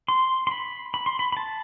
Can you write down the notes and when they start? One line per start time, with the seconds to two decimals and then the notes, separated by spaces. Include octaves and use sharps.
0.08 C6
0.47 C6
0.51 B5
0.94 B5
1.06 C6
1.19 B5
1.32 B5
1.37 A5